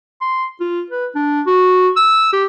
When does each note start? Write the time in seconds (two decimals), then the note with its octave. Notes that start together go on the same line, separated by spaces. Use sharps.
0.21 C6
0.60 F4
0.90 B4
1.15 D4
1.47 F#4
1.97 E6
2.33 G4